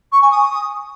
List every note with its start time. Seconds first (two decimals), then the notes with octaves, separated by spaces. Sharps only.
0.12 C#6
0.21 G#5
0.31 D#6